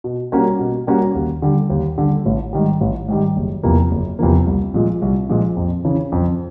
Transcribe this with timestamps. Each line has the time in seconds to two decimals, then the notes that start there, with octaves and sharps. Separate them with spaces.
0.04 B2
0.32 G3 A#3 C#4 F#4
0.59 B2
0.87 G3 A#3 C#4 F#4
1.15 D#2
1.42 D3 G3
1.70 D#2
1.98 D3 G3
2.25 A1
2.53 G#2 D#3 G3
2.81 A1
3.08 G#2 D#3 G3
3.36 F#1
3.63 E2 C3 F3 A#3
3.91 F#1
4.19 E2 C3 F3 A#3
4.46 C2
4.74 A#2 F3 G#3
5.02 C2
5.29 A#2 F3 G#3
5.57 F2
5.85 C#3 E3
6.12 F2